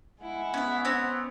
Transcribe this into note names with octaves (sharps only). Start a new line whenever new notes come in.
G#3 E4 F#5
B3 C#4 E5
C4 C#4 C#5